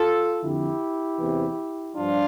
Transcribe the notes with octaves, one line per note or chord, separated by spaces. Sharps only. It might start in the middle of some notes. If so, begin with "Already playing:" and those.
Already playing: F4 A4
F2 D3 F3 E4 G4
E2 C3 E3
G2 F3 D4 F4